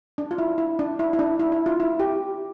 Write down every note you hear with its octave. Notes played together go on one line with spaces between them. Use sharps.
D4
F4
E4
E4
D4
E4
E4
D4
E4
E4
F4
E4
G4